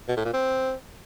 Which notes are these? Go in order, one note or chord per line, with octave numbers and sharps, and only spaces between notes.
B2
A2
A#2
C4